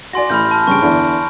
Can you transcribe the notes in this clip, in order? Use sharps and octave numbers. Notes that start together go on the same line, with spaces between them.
F#4 D5 G#5 C6 A#6
A1 B5 F6 G6
A5 F6
G2 C#3 C#6 D7
E2 D3